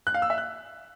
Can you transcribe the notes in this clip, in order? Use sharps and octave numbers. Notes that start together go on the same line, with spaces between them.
F#6
F5
E6
E5
F#6